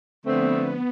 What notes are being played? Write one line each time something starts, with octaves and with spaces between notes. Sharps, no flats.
D3 F3 A3 B3 C4